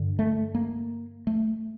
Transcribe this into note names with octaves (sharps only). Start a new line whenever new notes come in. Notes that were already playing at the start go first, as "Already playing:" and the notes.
Already playing: G2 D3
A3
A#3
A3